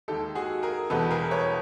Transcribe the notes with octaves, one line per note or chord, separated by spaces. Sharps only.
D#2 D#3 G#3 G4 A4
F#4 G#4
G#4 A#4
E1 E2 B2 G3 A4 B4
G#4 A#4
B4 C#5